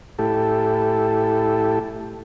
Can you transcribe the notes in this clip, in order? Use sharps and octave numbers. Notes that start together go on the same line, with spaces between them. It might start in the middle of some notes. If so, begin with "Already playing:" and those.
A2 E4 G4 A4